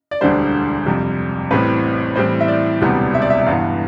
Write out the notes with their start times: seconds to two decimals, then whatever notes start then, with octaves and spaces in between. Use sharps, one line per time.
0.11 D5
0.21 E1 D2 D3 G3 D4 C5
0.86 F2 C3 G3
1.51 A1 A2 G3 C4 B4
2.16 A2 E3 G3 C4 C5
2.40 E5
2.48 D5
2.81 E1 D2 C3 G3 B3
3.14 E5
3.22 D5
3.30 E5
3.41 E5
3.46 G1 G2 E3 B3 F5